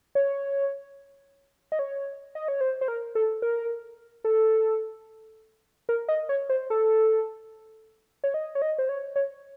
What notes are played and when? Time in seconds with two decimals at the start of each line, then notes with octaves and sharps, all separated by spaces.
0.15 C#5
1.72 D#5
1.79 C#5
2.35 D#5
2.48 C#5
2.61 C5
2.81 C5
2.88 A#4
3.15 A4
3.42 A#4
4.25 A4
5.89 A#4
6.09 D#5
6.29 C#5
6.50 C5
6.70 A4
8.24 C#5
8.34 D#5
8.55 C#5
8.62 D#5
8.79 C5
8.89 C#5
9.16 C#5